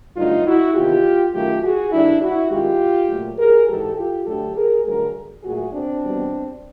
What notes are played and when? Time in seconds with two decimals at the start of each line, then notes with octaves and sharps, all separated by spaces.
0.16 G2 D3 F#3 A3 D#4 F4
0.45 E4 F#4
0.75 E2 C3 D#3 F4 G4
1.33 F#2 D#3 F#3 A3 F4 G4
1.62 F#4 G#4
1.92 G2 D#3 G3 D4 E4
2.21 E4 F#4
2.50 F#2 D#3 G#3 F4 G4
3.09 A#2 F#3 A3
3.38 G#4 A#4
3.68 G#2 E3 G#3 G4 A4
3.97 F4 G4
4.26 D2 D3 F#3 A3 G4 A4
4.55 G#4 A#4
4.85 G2 D3 F#3 A3 G#4 A#4
5.43 A#2 F#3 A3 F#4 G#4
5.73 C4 D4
6.02 E2 B2 G3